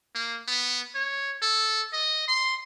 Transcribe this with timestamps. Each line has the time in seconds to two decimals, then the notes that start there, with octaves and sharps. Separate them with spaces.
0.15 A#3
0.48 B3
0.95 C#5
1.42 A4
1.93 D#5
2.28 C6